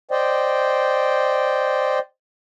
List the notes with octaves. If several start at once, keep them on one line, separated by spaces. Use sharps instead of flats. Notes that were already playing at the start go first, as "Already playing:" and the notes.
C5 D5 D#5 G5